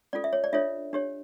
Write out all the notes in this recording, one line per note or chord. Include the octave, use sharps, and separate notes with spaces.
C#4 F4 A4 D5
E5
C#5
D5
D4 F4 A4 C#5 E5
D4 G4 C#5